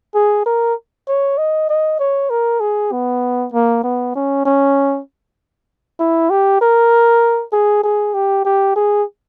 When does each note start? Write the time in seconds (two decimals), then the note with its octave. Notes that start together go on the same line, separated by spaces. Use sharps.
0.15 G#4
0.46 A#4
1.08 C#5
1.38 D#5
1.69 D#5
1.99 C#5
2.30 A#4
2.61 G#4
2.92 B3
3.53 A#3
3.84 B3
4.15 C#4
4.45 C#4
6.00 E4
6.30 G4
6.61 A#4
7.53 G#4
7.84 G#4
8.14 G4
8.45 G4
8.76 G#4